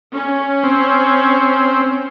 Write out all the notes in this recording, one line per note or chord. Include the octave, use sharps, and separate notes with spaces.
C#4
C4